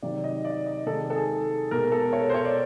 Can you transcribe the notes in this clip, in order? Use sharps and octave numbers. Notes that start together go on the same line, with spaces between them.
C3 D#3 F#3 D5
D#5
D5
D#5
C3 D#3 G#3 A4
A4
G#4
B2 G#3 A#4
A4
C#5
C5
C#5
D5